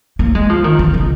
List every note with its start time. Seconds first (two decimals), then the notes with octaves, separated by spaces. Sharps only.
0.19 A#3
0.35 G#3
0.49 F3
0.64 D#3
0.79 D#3
0.94 C#3